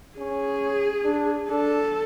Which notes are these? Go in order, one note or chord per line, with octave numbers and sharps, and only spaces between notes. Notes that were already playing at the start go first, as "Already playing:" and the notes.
C#4 G#4
D4
D4 A4